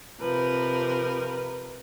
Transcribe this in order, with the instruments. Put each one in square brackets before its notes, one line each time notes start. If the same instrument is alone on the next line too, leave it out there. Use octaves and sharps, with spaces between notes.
[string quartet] C3 F3 A#4 B4